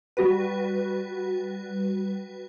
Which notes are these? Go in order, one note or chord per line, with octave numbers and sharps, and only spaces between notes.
G3 F#4 B4